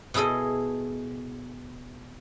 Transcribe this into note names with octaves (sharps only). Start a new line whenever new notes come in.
B2 E4 G#4 A4 D#5